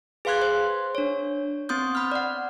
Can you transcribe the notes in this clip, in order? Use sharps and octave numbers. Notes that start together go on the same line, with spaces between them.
G#4 B4 F5 C6 F#6 G#6
C5 C6
D4 C#5
B3 C4 C6 D#6 G6
B5 F6
D5 F#5